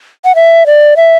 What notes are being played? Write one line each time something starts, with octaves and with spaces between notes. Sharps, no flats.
F#5
E5
D5
E5